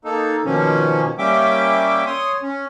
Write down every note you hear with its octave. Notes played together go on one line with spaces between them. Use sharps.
A#3 D#4 A4
B2 D#3 F3 A#3 C#4
G3 A#3 C#4 E5 G5 D6
C#5 C6 D#6
C#4